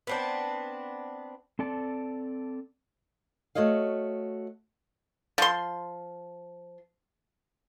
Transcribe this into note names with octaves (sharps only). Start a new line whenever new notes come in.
B3 C4 D4
C4 A4 D5 A5
A3 F#4 C#5 D#5 F5
F3 C6